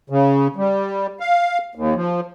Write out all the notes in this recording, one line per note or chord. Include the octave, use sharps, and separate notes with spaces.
C#3
G3
F5
D#2
F3